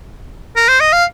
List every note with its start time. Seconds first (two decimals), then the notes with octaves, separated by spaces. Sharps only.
0.56 A#4
0.69 C5
0.80 D#5
0.93 F5